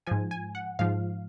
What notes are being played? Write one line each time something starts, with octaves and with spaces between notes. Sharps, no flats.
G#2 F3 G#5
G#5
F#5
G#2 F3 F5